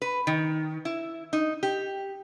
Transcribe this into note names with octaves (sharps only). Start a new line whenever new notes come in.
B4
D#3
E4
D#4
G4